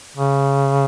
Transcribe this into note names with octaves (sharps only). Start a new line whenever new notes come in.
C#3